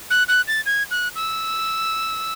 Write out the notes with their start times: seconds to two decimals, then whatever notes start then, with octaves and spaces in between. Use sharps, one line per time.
0.10 F#6
0.28 F#6
0.48 A6
0.66 G#6
0.91 F#6
1.16 E6